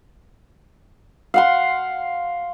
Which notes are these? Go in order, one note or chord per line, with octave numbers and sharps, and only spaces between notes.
F5 F#5 C6